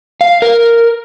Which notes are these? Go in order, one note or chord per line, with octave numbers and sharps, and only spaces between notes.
F5
A#4